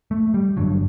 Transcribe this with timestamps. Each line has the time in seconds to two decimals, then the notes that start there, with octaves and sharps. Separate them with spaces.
0.11 A3
0.34 G3
0.57 G1 G2 D3 F#3